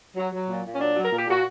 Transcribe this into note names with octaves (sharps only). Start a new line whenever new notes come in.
F#3
F#3
A#2
A#2
C#4
F#3 D4
F#3
A#4
A#2
G4
A#2 F#4